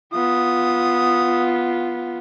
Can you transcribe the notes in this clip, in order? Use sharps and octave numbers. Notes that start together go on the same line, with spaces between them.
B3 F4 D#6